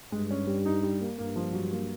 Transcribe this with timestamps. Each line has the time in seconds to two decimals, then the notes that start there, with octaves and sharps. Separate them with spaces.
0.12 G2 G#3
0.31 C#4
0.47 G3
0.66 D#4
0.83 G3
1.01 A#3
1.18 G2 A#3
1.36 F3
1.53 F#3
1.72 A#3